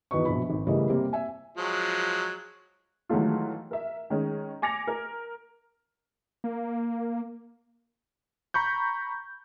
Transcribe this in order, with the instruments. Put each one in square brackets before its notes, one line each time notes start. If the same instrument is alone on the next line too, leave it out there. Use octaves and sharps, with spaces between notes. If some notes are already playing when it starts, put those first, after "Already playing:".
[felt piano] E2 D#3 F#3 B4 D#5 C#6
A#1 B2 B5
G#1
A2 C#3 E3 G3 A#4 D#5
C3 G3 A#3 C4
E5 G#5
[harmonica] F3 F#3 G#3
[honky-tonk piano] D#3 E3 F#3 G#3 A3 F4
A#4 E5
D#3 G#3 C#4
G#5 D6 A#6 C#7 F7
A#4
[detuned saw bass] A#3
[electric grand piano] A#5 B5 C#6 G6